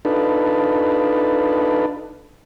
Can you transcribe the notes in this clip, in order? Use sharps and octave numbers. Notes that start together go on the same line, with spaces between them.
D4 D#4 F4 A4 B4